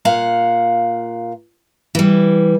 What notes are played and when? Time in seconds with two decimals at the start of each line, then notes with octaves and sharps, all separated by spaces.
0.05 A#2 F5 F#5
1.95 E3 G3